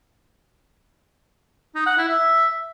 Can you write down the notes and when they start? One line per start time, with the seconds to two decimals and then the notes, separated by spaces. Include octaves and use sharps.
1.75 D#4
1.86 F#5
1.98 E4
2.09 E5